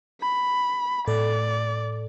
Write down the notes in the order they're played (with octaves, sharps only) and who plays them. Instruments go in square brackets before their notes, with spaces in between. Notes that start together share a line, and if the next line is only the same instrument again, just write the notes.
[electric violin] B5
[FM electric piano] A2 A4 [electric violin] D5